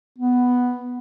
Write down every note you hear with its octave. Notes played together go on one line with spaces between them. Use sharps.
B3